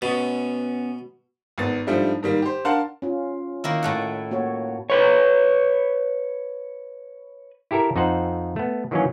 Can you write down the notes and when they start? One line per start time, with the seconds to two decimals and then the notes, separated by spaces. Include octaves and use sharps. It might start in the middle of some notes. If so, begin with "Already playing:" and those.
0.02 B2 B3 C#4
1.58 G#1 B3 A6
1.87 G#2 F3 G3 A3 D4
2.23 G#2 D#3 G3 A#3
2.42 G4 C5
2.65 D4 A#4 F5 F#5 A5 C6
3.02 C#4 F4
3.64 D#3 A#3 E4
3.83 A2 A3 F#5
4.31 A#3 F#4 C#5
4.90 B4 C#5
7.71 E4 G4 A4 A#4 E5
7.96 F2 D#4 A4 C5 F#5
8.56 A3 B3
8.91 D#3 E3 F#3 A#3 C#4